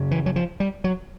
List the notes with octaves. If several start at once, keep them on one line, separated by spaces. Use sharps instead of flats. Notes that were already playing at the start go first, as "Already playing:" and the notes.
Already playing: F#2 C#3
E3
F#3
F3
G3
F#3